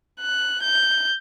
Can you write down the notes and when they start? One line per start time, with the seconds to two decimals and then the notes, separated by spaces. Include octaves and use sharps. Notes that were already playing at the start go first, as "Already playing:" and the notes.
0.21 F#6
0.63 G6